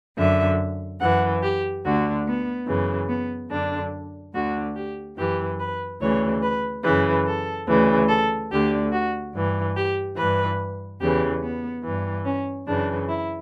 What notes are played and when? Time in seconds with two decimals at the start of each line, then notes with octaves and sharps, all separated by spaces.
0.17 F#2 D3 E5
1.00 F#2 E3 F#5
1.42 G4
1.84 D2 D3 F#4
2.25 B3
2.66 F#2 C#3 E3
3.09 B3
3.50 F#2 D3 D4
4.33 D2 D3 F#4
4.75 G4
5.16 F#2 E3 G4
5.58 B4
6.00 D2 C#3 E3 C#5
6.42 B4
6.83 F#2 C#3 E3 B4
7.25 A4
7.67 D2 C#3 E3
8.08 A4
8.50 D2 D3 G4
8.92 F#4
9.33 G2 E3
9.75 G4
10.16 G2 E3 B4
11.00 E2 C#3 E3 G4
11.42 B3
11.83 G2 E3
12.24 C#4
12.67 F#2 C#3 E3 D4
13.08 E4